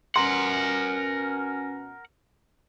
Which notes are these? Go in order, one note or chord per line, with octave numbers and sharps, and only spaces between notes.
B2 C#4 A#4 F#5 A#5 C6